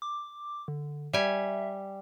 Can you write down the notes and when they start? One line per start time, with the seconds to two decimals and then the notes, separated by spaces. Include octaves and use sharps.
0.02 D6
0.68 D3
1.13 G3 E5 G#5